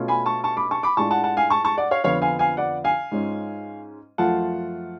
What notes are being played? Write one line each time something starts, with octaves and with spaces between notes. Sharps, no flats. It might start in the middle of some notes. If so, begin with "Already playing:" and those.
Already playing: B2 A3 C#4 F4
G#5 B5
A5 C#6
A5 C#6
B5 D6
A5 C#6
B5 D6
A2 G#3 D4 F4 A5 C#6
F#5 A5
F#5 A5
F5 G#5
A5 C#6
A5 C#6
D5 F#5
C#5 F5
F2 D3 F3 B3 F4 C#5 F5
F5 G#5
F5 G#5
D5 F#5
F5 G#5
G#2 G#3 C#4 F4
F#2 F3 A3 F4 F#5 A5